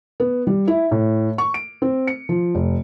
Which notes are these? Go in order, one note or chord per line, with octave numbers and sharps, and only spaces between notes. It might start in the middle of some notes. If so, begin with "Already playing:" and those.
B3
G3
E4
A2
C#6
D7
C4
C#7
F3
F1